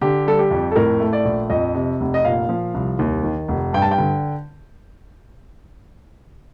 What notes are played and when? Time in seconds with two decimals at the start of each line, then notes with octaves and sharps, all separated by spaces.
0.01 D3 G4
0.26 G3 A4
0.39 G4
0.51 F2
0.71 A4
0.76 A2 A#4
1.00 A3
1.13 D5
1.25 A#1
1.50 F2 D#5
1.75 C3
2.00 F1
2.14 D#5
2.25 A#2 F5
2.49 F3
2.74 C2
2.99 D#2
3.23 D#3
3.48 F1
3.73 G2 G5
3.82 A5
3.91 G5
3.98 D3